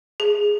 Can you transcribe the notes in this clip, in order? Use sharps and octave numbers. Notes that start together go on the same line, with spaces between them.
G#4